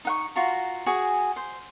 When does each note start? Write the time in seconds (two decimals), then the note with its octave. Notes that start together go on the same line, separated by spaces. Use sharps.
0.05 D#4 F#5 C#6
0.35 F4 F#4 A#5
0.86 F#4 G#4 G#5
1.36 C5